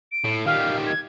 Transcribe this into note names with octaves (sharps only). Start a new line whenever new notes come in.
D7
A2
D#3 G3 F5
G#6